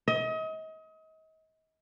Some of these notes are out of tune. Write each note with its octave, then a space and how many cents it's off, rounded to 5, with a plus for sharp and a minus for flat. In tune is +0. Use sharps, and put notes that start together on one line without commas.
D#5 +35